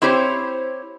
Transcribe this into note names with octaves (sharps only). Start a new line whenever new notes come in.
C4 E4 G4 C5 C#5